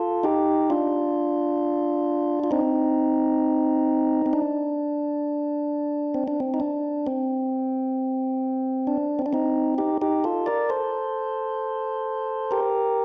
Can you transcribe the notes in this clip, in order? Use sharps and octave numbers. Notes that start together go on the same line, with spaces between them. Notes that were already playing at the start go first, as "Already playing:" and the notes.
Already playing: F4 A4
D#4 G4
D4 F4
F4
C4 D#4
C4
D4
C4
D4
C4
D#4
D4
C4
D4
C4
D4
C4 D#4
D#4 G4
D#4 G4
F4 A4
A#4 D5
A4 C5
G4 A#4